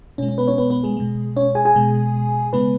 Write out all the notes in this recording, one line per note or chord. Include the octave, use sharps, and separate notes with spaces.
B2 G#3 C#4
C#4
B3 B4
C#4 C#5
B3 B4
B3 B4
G#3 G#4
B2 G#3
C#4 C#5
G#4 G#5
G#4 G#5
B2 G#3
C#3 G#3 B3 B4